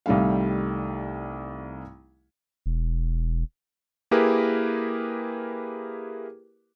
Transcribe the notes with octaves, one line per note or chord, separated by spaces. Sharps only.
C2 D#3 G3 A3 F5
E1
A#3 E4 G4 G#4 A#4 B4